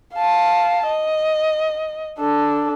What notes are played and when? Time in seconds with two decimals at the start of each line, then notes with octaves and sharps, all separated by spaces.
0.14 F5 A5
0.87 D#5
2.19 D4 A4